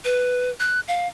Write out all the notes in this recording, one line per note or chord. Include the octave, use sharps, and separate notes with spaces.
B4
F#6
F5